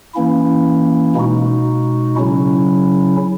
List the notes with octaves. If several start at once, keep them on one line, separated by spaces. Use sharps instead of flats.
E3 A#3 C#4 E4
B2 G#3 D#4 F#4
C#3 F#3 C#4 E4